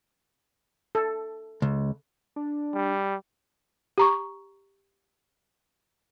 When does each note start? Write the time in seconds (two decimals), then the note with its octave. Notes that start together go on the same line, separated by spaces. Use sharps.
0.95 A4
1.62 C#2
2.36 D4
2.73 G3
3.98 G4 A#5 C#6